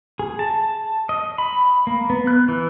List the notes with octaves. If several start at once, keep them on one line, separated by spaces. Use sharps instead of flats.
G#4
A5
D#5
B5
A#3
B3
F#6
E3